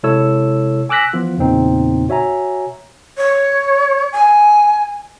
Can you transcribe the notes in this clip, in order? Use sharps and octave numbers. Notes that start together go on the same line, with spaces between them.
C3 G#3 E4 A4 C#5 E6
G#5 D6 E6 F#6 A#6 B6
E3 F3 B3 F4
E2 A#2 C#3 A#3 C4 D#4
F#4 C#5 E5 G#5 A#5
C#5
G#5